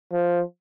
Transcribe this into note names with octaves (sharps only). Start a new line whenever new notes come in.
F3